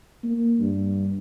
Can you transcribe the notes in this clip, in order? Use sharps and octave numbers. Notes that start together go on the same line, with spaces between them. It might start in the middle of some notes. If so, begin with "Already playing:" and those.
A#3
G2